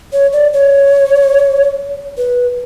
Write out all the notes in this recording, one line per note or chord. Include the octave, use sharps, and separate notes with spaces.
C#5
D5
C#5
B4